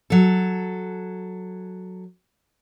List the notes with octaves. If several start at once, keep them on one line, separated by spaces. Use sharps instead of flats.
F#3 A4